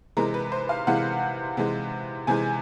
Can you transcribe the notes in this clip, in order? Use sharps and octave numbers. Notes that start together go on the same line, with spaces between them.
C3 E3 G#3 A#4
B4
C5
F5
C3 E3 G#3 F#5
C3 E3 G#3
C3 E3 G#3 G#5